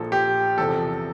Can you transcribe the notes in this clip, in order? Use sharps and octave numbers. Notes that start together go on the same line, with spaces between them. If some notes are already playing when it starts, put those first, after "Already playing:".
Already playing: A#1 A#2 F3 A4
G4
E2 C3 F3 A4